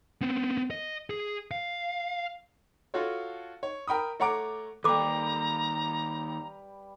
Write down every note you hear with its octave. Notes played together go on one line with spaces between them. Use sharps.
B3 C4
D#5
G#4
F5
F4 F#4 A4 C#5
C#5
A#4 G5 B5 D#6
A3 C#5 F#5 A#5 D6 D7
D#2 G3 A4 B4 A#5 D6